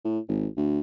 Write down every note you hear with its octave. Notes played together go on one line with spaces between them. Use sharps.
A2
G#1
D2